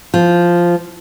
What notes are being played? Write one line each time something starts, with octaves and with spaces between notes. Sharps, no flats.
F3